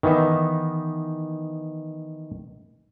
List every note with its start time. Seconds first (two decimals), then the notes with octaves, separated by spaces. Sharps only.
0.03 D#3 E3 B3 D#4 E5